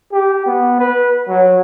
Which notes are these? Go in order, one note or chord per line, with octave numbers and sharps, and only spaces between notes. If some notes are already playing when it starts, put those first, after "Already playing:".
G4
B3
B4
F#3